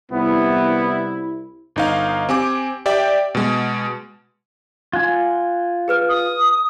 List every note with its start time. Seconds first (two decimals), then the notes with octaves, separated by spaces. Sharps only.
0.11 C2 B3 E4
1.76 G1 D#4 F5
2.29 C4 G4 G#5 D6
2.86 G4 D5 E5 G5
3.35 B2 G#3
4.93 F4 F#5 G#5
5.88 G#4 B4 F6
6.09 D#6